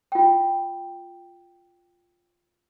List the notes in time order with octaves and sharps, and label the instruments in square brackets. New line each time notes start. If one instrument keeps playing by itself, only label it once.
[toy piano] F4 G5